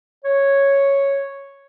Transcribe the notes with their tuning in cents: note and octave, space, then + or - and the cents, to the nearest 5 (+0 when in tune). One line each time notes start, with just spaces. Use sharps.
C#5 -5